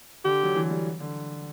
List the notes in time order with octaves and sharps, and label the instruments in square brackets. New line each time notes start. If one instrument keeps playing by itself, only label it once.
[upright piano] D3 [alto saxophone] G4
[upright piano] F#3
E3
G3
D3